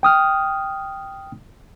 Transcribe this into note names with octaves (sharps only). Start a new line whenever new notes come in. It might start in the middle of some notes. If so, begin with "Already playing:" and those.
G5 D#6 F6